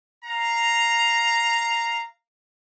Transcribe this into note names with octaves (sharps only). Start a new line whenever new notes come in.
F5 A#5